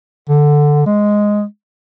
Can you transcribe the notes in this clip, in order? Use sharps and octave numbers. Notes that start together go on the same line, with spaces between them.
D3
G#3